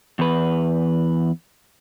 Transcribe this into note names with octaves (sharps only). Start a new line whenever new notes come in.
E2 B4